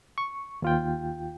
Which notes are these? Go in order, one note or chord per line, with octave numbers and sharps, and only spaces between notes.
C#6
D#2 F4 G5